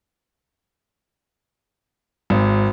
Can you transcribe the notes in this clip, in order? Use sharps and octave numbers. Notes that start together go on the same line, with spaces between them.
G#1